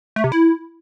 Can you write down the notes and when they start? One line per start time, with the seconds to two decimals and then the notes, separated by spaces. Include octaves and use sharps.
0.16 A3
0.24 C3
0.32 E4